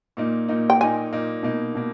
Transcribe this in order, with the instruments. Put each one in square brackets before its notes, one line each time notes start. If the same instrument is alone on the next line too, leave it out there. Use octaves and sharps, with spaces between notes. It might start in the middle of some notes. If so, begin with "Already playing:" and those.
[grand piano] A#2 A#3 D#4
A#2 A#3 D#4
[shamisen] G5
[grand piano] A#2 A#3 D#4 [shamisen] G#5
[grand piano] A#2 A#3 D#4
B2 A#3 D#4
B2 A#3